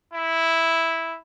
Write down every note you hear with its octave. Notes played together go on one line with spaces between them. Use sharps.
E4